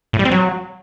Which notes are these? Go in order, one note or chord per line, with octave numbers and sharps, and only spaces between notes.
A2
G3
C4
F#3